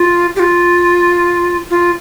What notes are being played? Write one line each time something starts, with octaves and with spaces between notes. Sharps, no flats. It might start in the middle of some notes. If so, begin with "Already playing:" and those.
Already playing: F4
G4
F4
F4